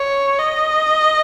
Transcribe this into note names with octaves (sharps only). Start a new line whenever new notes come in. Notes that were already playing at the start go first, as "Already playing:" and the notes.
Already playing: C#5
D#5